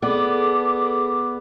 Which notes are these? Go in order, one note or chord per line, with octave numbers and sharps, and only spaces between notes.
B3 G#4 A4 D5 D6